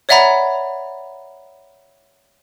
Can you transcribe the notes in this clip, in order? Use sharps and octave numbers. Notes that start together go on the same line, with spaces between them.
C#5 D5 E5 F#5 A#5 B5